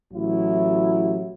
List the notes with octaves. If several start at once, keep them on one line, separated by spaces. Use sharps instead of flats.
A1 F#3 E4